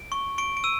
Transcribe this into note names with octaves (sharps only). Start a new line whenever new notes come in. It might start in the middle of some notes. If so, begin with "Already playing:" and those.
Already playing: D7
C#6
C#6 D7
D7
E6 D#7